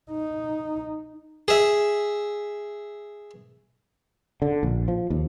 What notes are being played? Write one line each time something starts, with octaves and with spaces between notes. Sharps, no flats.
D#4
G#4 E5
D3
A#1
F3
D#2